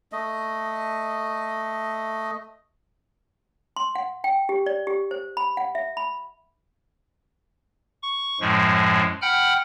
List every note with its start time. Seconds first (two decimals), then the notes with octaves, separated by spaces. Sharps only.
0.12 A3 D#5
3.76 C6
3.95 F#5
4.24 G5
4.49 G4
4.66 D5
4.87 G4
5.11 C5
5.37 B5
5.57 F#5
5.75 E5
5.97 B5
8.03 C#6
8.41 F#2 A2 F3 G#3
9.22 F#5 G5 B5 F6 G6